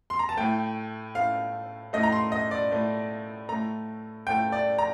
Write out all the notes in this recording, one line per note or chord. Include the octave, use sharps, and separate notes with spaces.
C6
A#5
A5
A2 A3 G5
A2 A3 F5
A2 A3 D#5
A#5
C6
D#5
D5
A2 A3
A2 A3 A#5
A2 A3 G5
D5
A#5